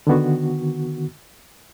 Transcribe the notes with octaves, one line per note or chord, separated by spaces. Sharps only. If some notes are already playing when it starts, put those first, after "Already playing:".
D3 D#3 B3 F#4